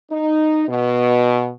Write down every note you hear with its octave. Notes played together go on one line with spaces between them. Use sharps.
D#4
B2